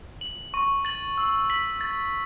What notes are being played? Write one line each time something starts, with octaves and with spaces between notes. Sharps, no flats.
F#7
C#6
A6 F#7
E6
B6 F#7
A6